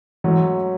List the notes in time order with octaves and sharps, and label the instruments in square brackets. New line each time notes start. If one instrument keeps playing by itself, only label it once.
[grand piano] G#2 F#3 A3 C#4 F#4 [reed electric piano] E3